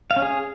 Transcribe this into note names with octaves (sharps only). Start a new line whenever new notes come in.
F5
C#4
G#4